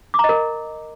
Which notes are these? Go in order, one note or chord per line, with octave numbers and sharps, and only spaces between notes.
D6
A#5
D#5
A#4